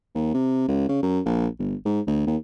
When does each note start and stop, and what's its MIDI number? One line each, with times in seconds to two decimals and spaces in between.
0.15 0.31 39
0.34 0.65 48
0.68 0.89 37
0.89 0.99 49
1.03 1.20 42
1.25 1.47 34
1.59 1.75 31
1.85 2.01 44
2.07 2.23 38
2.27 2.37 39